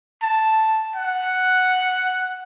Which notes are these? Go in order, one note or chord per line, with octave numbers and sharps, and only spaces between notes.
A5
F#5